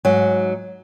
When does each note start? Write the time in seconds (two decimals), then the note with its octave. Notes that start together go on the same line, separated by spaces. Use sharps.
0.05 G#2 F#3